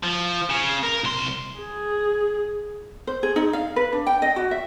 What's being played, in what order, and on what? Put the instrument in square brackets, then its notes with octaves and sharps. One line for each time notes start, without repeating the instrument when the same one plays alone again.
[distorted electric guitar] F3
C#3
A#4
C2 C6
[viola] G#4
[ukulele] C5
G#4
D#4
F5
B4
D4
G5
D#5
F#4
E5